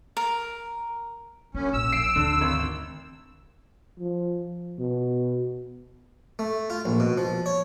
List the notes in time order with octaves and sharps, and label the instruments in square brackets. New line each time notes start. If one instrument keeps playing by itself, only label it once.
[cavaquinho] A#4
[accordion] F#2 C#4 [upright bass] D4
[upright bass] A#1 [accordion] E6
[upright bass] F3 [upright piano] C7 D7
[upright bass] D2 [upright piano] D3
[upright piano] G#1
[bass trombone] F3
B2
[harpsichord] A3
F4
A#1
B2
F3
C#5